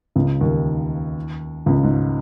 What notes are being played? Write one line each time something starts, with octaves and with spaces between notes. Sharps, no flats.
C#2 C#3
D#2 D#3
C#2 C#3
G#2